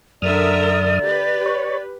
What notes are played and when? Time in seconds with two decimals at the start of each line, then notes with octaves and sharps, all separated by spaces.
0.22 F#2 D3 A#4 D5 E5 D#6 F6
1.03 G4 B4
1.46 C#5